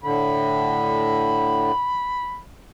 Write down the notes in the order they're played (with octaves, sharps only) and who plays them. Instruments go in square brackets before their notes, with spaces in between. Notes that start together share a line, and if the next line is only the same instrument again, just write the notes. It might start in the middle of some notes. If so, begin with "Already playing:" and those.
[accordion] A2 D3 [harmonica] B5